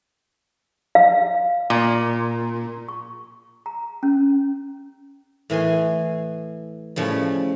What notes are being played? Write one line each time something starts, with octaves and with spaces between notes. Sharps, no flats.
F5
A#2
C#6
A#5
C#4
A2 E3 G#5 C6
A2 C#3 F3 G3